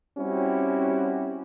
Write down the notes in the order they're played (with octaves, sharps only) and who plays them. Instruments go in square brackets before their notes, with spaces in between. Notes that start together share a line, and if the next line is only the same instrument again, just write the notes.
[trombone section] G3 C4 C#4 E4 F#4 G4